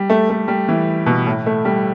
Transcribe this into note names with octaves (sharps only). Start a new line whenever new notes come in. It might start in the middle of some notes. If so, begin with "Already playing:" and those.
Already playing: G3
A3
A3
G3
E3
B2
A2
A3
G3